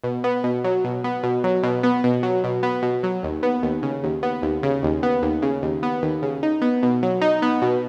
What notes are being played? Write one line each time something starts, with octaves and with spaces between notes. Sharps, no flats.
B2
B3
B2
F#3
B2
B3
B2
F#3
B2
B3
B2
F#3
B2
B3
B2
F#3
D#2
B3
D#2
C#3
D#2
B3
D#2
C#3
D#2
B3
D#2
C#3
D#2
B3
D#2
C#3
D#4
B3
B2
F#3
D#4
B3
B2